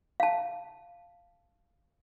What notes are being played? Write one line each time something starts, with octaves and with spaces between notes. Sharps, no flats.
F5 A5